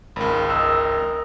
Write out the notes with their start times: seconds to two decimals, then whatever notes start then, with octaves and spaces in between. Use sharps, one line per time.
0.16 G#1 C#2 A#4 B5
0.50 A#4 D#5 A#5 D#6 E6 F#6